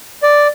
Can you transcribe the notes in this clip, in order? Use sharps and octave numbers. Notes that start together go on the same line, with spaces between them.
D5